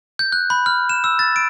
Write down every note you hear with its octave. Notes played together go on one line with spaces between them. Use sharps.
G6
F#6
B5
F6
E7
E6
A6
D7